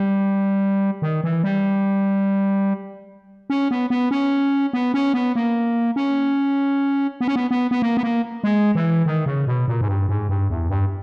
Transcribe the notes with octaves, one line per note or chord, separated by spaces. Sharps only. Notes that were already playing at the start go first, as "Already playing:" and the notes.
Already playing: G3
D#3
E3
G3
C#4
B3
B3
C#4
B3
C#4
B3
A#3
C#4
B3
C#4
B3
B3
B3
A#3
B3
A#3
G#3
E3
D#3
C#3
B2
A#2
G#2
G2
G#2
G2
E2
G2